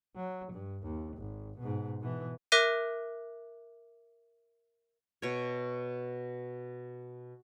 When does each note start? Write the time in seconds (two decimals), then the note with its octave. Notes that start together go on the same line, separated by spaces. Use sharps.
0.16 F#3
0.53 G2
0.83 D#2
1.17 G#1
1.59 G#2 B2
2.01 B2 E3
2.52 A#4 E5 D6 F#6 A#6 D#7
5.22 B2 C#5